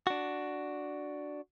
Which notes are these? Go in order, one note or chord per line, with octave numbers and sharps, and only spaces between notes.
D4 F#4